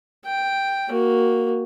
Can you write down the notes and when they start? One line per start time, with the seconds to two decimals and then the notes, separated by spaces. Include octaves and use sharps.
0.25 G5
0.89 A#3 F#4